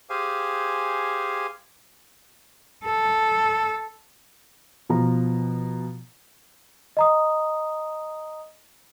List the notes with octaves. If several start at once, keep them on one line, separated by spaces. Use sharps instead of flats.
G4 G#4 C5 F5 G#5
A4
B2 F3 A#5
D#5 A#5 D#6